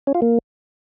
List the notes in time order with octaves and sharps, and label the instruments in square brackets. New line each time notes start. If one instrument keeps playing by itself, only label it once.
[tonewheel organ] C#4
F4
A#3